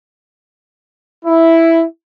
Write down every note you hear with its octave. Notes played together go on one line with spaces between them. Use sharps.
E4